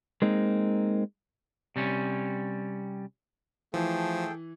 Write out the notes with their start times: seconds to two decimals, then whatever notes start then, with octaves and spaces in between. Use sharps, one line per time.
0.22 G#3 A#3 C4 D#4
1.76 C3 G3 C#4
3.74 E3 F3 A3 G#4 A4 G5